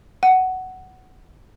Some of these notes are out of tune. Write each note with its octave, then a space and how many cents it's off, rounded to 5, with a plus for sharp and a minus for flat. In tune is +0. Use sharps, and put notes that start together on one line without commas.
F#5 +10